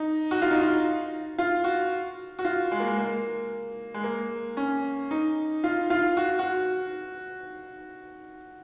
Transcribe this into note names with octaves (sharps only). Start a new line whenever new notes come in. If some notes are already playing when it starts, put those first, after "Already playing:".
Already playing: D#4
F#4
F4
D#4
F4
F4
F#4
F#4
F4
G#3
A#3
G#3
A#3
G#3
A#3
C#4
D#4
F4
F4
F#4
F#4